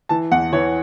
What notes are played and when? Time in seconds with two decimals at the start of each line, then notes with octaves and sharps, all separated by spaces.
0.09 E3 A5
0.31 E2 F#5
0.52 E3 C#5